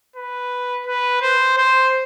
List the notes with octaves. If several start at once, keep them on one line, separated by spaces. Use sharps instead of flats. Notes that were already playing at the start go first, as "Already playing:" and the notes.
B4
B4
C5
C5